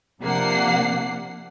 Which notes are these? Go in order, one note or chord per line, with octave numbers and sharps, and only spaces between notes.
C3 F3 A#3 D4 F#5 C7